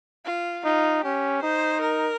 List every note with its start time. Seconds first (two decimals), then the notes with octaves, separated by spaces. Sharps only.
0.25 F4
0.64 D#4 F4
1.03 C#4 G4
1.42 D#4 C5
1.81 A#4